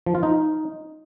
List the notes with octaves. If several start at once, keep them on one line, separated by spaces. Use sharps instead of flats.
F3
F4
D#4